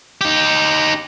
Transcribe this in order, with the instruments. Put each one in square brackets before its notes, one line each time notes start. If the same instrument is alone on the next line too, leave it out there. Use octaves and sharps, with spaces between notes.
[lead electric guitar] D#4 G4